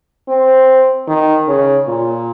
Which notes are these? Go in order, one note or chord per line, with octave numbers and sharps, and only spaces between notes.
C4
D#3
C#3
A#2